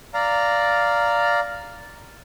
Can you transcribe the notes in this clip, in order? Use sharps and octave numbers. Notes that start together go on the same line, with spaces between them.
D5 F5 A#5